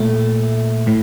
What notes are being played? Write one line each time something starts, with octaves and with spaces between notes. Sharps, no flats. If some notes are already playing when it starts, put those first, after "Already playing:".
Already playing: A#2 A3
A2